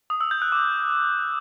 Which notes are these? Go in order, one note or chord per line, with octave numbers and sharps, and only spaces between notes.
D#6
E6
G6
F#6
D6